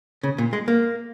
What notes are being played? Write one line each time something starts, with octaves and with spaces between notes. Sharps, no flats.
C#3
A#2
G#3
A#3